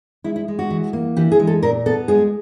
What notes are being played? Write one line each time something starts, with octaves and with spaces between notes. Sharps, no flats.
G#3 E4
E4
G#3
F#4
E3
A#3
E3 G4
G#4
G#3
A4
A#2 A#4
B3 A4
G#3 G#4